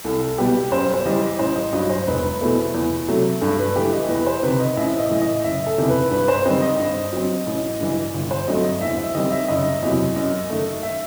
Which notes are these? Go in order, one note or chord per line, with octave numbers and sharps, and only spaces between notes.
C2 A4
B2 G3 B3 G4
F#2 C5
C5
E3 G3 D#5
A1 C5
D#5
G2 F#3 D#5
C5
E1 B4
E2 B2 A3
E2
C3 F#3 A3
G2 A4
B4
E3 A3 G4
D#5
E2 B4
C5
C3 D#3 B4
D#5
A1 E5
D#5
A2 E3
D#5
F#1 E5
A4
E2 C3 D#3
B4
G2 B4
C5
D#3 G3 C4 D#5
D#5
G2
F#3 C4
A1
G2 E3
G1
C5
G2 F#3 A3 C4 D#5
D#5
E2 E5
E5
D#3 G3 C4 D#5
E5
F#1 D#5
E2 C3 F#3 D#5
F#2 D#5
D#3 A3
E5